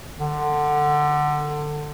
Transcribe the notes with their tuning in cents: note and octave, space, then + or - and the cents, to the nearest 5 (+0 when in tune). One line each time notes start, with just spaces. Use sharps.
D3 +20